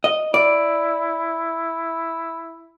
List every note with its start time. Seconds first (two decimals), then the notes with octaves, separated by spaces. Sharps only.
0.04 D#5
0.34 E4 D5